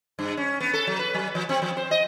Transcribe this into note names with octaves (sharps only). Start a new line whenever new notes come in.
G2
C#4
B3
A4
F#3
B4
F#3
F3
C4
F3
C5
D#5